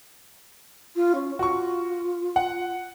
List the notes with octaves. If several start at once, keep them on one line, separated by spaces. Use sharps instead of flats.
F4
C#4
F4 F#4 C#6
F#5